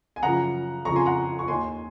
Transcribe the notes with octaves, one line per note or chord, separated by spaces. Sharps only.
G#5
F#2 C#3 F3 F#5 A#5
F2 C#3 F3 A#5 C#6
G#5 C6
F#5 A#5
C#6
D#2 D#3 G#5 C6